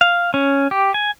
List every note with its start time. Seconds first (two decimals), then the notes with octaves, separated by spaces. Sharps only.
0.01 F5
0.34 C#4
0.71 G4
0.94 G#5